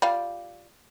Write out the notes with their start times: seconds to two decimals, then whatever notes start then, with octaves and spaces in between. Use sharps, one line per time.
0.02 G3 F4 F5